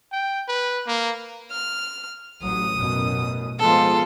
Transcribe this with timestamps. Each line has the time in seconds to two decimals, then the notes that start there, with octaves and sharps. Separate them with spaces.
0.12 G5
0.49 B4
0.87 A#3
1.51 F6
2.43 A1 F#3 D#6
2.77 A1 F#2 B2
3.59 F3 G#3 B3 F4 A4